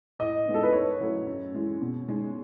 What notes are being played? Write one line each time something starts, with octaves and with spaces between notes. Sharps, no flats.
A2 D#5
G#3 B3 D#4
A4
B4
G#2 C#5
F#3 A3 E4
F#2
E3 G#3
B2
G#3 D#4